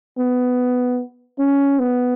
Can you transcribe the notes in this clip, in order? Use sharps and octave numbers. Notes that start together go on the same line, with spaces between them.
B3
C#4
B3